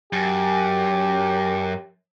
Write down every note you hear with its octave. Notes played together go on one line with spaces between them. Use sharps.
F#2 G4